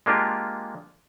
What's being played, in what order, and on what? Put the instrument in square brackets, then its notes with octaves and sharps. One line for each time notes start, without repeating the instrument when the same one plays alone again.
[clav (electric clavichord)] G#3 A#3 D4 F4 G4